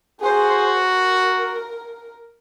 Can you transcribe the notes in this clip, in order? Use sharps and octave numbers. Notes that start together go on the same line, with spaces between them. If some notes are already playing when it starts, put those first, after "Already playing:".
F#4 G#4 C5
A#4